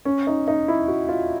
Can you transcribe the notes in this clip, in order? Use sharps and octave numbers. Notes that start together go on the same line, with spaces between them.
C#4
D#4
D#4
E4
F#4
F4